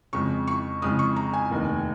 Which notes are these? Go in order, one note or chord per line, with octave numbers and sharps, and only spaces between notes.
F2 C#3 G#3 C#6
C#6
F2 C#3 G#3 D#6
C#6
A#5
G#5
F1 D#2 D#3